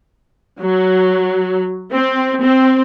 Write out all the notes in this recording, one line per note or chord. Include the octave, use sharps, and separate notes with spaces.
F#3
C4
C4